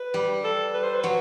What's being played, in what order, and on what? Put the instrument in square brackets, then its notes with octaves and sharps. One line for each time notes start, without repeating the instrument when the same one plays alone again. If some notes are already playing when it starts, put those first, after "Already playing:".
Already playing: [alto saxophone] B4
[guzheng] G3
[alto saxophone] A4
B4
C5
B4
[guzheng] F#3